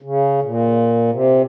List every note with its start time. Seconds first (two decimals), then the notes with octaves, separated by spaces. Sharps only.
0.02 C#3
0.42 A#2
1.11 C3